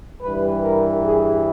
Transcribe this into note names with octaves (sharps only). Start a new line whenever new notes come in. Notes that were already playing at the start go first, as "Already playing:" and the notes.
G2 E3 G3 B4
A#4
G#4